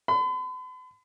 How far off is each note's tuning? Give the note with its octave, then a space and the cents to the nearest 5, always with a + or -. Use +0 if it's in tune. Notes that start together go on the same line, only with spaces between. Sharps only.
B5 +45